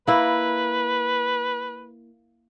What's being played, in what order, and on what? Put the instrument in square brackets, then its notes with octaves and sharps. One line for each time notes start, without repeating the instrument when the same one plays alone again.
[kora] A#3 E4 [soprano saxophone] B4